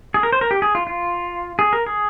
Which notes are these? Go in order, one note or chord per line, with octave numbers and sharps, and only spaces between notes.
G#4
A#4
C5
A#4
G4
G#4
F4
F4
G#4
A#4
G#4